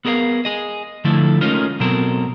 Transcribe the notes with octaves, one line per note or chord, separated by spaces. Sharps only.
B3 G#4 A#4 D#5 F5
G#4 D#5
D3 F3 A3 E4 A4
G#3 A3 C#4 D#4 F4 A#4
B2 F#3 C4 A4 A#4